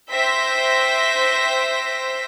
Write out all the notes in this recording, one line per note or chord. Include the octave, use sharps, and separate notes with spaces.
C5 E5 G5 A#6 B6